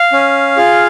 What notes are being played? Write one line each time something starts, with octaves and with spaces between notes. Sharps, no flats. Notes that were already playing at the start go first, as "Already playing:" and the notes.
Already playing: F5
C#4
F4 G#4